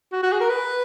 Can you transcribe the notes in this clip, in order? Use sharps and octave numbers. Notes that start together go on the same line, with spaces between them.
F#4
F#4
G#4
A#4
B4